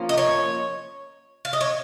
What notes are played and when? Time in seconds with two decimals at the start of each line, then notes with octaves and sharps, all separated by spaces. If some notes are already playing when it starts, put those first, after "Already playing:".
Already playing: F3 A#3 C#4
0.09 D#5
0.18 C#5
1.45 F5
1.53 D#5
1.61 C#5